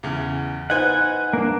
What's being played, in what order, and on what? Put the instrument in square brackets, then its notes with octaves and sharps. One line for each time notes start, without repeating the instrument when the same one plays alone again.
[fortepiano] E2 C#3
[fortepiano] D#4 B4 C5 [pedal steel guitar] F#5 G#5
[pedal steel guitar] A#3 D4